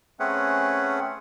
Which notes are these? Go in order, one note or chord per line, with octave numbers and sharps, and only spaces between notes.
A3 C4 C#4 G#4 B4 F#5